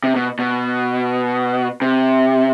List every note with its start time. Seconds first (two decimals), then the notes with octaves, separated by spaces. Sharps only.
0.04 C3
0.15 B2
0.39 B2
1.82 C3